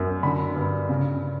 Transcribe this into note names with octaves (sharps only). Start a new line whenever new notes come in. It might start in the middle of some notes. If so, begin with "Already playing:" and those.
Already playing: F#2
D3 B5
G2
C#3